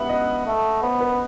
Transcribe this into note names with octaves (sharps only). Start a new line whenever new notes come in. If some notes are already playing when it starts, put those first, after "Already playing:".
Already playing: B3 E5 F#5
D#5
A3
B3 C5
B4